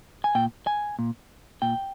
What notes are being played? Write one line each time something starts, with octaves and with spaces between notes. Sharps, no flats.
G#5
A#2 G5
G#5
A#2
A#2 G5